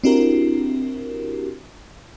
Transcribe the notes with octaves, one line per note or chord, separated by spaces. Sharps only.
C4 D4 E4 F#4 G4 A#4